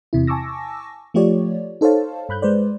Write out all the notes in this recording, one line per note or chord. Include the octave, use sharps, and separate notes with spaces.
E2 C3 E4
G#5 A5 C#6 D6 E6 A#6
F3 A3 F4 G4 C#5 D5
D#4 A4 C5 C#5 F5 A5
G2 B5 F#6 G6
G#3 B4 C5 D5